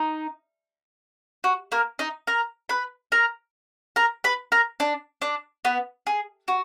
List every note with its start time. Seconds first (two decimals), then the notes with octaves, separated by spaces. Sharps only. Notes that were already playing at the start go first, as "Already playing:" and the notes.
Already playing: D#4
1.44 F#4
1.72 A#3 A#4
1.99 D#4 D#5
2.27 A#4 A#5
2.69 B4 B5
3.12 A#4 A#5
3.96 A#4 A#5
4.24 B4 B5
4.52 A#4 A#5
4.80 D4 D5
5.22 D4 D5
5.65 B3 B4
6.07 G#4
6.48 F#4